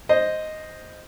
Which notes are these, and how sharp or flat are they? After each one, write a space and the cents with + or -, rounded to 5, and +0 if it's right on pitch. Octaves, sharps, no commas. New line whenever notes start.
C5 +0 D#5 +0